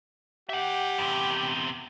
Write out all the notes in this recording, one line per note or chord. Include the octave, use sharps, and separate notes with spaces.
G4 E5 F#5
E2 C3